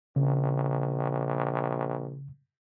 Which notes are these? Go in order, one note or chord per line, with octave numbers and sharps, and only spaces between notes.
A#1 C#3